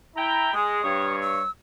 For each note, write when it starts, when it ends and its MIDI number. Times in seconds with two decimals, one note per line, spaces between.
0.16 0.53 64
0.16 0.53 79
0.16 0.53 82
0.54 0.82 56
0.54 1.16 87
0.83 1.41 43
0.83 1.41 73
1.22 1.50 88